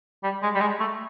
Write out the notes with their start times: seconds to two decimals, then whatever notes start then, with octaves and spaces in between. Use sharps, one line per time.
0.23 G3
0.43 G#3
0.55 G3
0.60 G#3
0.80 A3